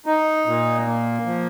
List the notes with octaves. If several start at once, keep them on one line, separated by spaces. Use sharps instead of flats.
D#4
A#2
A#3
F3